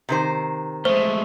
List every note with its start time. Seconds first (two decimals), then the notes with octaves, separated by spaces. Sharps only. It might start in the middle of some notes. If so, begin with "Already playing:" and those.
0.09 C3 D#3 C5
0.85 G#3 A3 C5